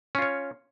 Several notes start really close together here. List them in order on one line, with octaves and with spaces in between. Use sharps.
C#4 F4 C#5